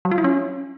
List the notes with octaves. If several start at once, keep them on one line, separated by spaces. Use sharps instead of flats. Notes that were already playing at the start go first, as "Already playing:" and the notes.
F#3
F4
E4
C#4